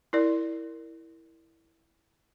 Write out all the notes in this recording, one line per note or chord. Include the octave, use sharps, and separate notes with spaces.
E4 A#4 D5